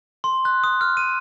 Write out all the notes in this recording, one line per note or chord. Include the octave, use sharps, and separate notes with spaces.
C6
F#6
D#6
F6
D#7